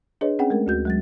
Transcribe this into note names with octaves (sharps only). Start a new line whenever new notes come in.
D4 G#4 B4 C#5 D#5
C4 C#4 G#4 F#5 G5
G#3 A3 A#4
D2 F#4 G6
F#3 G#3 A6